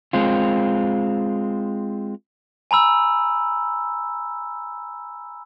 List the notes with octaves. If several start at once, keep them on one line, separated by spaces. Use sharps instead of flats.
G#3 C4 F4
G#5 A#5 B5 E6